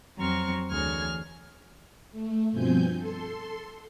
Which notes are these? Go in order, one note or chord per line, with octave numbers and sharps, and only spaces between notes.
F2 F#3 C4 A#5 C#6 F6
D2 E3 G#4 C#5 F6 G#6
A3
G2 B2 F3 C4 G#5 G6
A4 C6